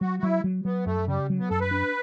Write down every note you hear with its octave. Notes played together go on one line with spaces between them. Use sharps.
F#3 F#4
F#4
F#3 E4
F#3
F#3 B3
F#2 A3
C#3 G3
F#3
B3
F#2 A4
B4
D4